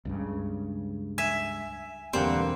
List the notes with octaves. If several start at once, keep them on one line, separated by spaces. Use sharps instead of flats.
C#2 G2 C#3
E5 G#5
E1 E2 D3 G3 A#3 C4 F#5